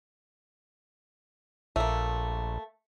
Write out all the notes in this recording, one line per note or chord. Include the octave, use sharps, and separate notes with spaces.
A#1 A3 A#3